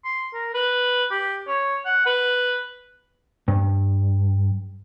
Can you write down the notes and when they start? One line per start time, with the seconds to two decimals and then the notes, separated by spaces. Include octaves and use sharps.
0.05 C6
0.34 A#4
0.54 B4
1.11 G4
1.48 C#5
1.86 F#5
2.06 B4
3.48 G2